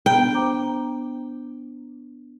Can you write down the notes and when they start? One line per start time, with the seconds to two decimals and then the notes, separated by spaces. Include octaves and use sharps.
0.06 B3 D4 G5 A#5
0.34 C5 A#5 D6